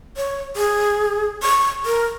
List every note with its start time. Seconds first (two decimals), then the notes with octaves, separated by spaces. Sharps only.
0.17 C#5
0.56 G#4
1.43 C#6
1.86 A#4